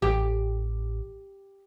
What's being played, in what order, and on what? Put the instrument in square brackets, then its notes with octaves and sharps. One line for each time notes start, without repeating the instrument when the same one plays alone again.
[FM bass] A1 [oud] G4